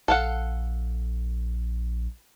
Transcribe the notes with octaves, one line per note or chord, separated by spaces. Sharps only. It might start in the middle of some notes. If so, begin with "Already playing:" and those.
A#1 A4 F5 F#5